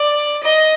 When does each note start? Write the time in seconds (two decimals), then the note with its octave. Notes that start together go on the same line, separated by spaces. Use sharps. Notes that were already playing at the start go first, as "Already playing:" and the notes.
Already playing: D5
0.43 D#5